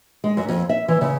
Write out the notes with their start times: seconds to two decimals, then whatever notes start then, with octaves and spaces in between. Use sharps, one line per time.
0.24 G#3
0.37 F#2
0.49 F2
0.69 E5
0.88 E3
1.01 C#3